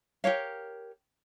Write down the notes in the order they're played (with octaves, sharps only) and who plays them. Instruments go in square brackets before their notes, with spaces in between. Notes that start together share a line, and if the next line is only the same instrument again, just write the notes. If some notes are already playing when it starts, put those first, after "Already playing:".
[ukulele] G4 A#4 C#5 F5